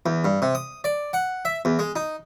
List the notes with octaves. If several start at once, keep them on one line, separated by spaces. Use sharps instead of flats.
E2
G2
C3
D#6
D5
F#5
E5
E2
G#3
D#4